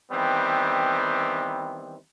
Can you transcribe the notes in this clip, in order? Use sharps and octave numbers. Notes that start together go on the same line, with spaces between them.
D#3 E3 G3 B3 C4